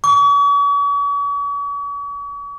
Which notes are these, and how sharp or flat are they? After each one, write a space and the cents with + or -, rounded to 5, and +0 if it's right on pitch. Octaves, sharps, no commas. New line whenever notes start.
C#6 +45